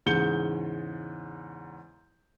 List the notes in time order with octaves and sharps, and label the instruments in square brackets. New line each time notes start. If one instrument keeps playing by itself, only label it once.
[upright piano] E2 G#2 C#3 G6 C#7 G7